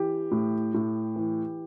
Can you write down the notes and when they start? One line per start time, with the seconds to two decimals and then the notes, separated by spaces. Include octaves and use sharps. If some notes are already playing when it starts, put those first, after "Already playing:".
Already playing: E3 G4
0.31 A2
0.74 A2
1.16 E3